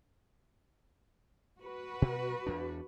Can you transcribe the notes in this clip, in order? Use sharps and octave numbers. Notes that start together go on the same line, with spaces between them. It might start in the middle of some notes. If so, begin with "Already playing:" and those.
F#4 B4
B2
E2 D4